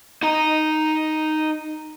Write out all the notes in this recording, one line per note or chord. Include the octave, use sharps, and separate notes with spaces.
D#4 A#5